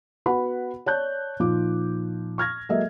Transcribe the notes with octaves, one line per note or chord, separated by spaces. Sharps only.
B3 F#4 B4 F#5 B5
C#5 D5 A5 F#6 G6
A#2 F3 D#4 F4 D6
C#6 F6 G#6 A#6
F#3 G#3 A#3 A4 D#5 E5